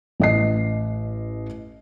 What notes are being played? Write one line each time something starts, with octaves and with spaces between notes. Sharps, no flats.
A1 D#5 C7